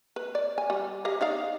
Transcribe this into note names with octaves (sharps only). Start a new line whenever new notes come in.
B4
D5
G#5
G3
G4 D#5 F5
D#4 D5 F5